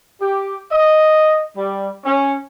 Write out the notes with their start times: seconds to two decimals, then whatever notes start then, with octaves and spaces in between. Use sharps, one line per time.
0.21 G4
0.71 D#5
1.56 G3
2.04 C#4